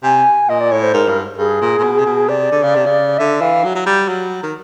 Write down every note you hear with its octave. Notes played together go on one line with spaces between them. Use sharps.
C3 G#5
A#2 D#5
D5
A2 C#5
C5
G#2 A#4
G2
G2 G#4
A#2
A#2
B2
C3
B2
C3 D5
D3
C#3
C3
C#3
D3 E5
E3 F5
F#3
F#3
G3
F#3
D#3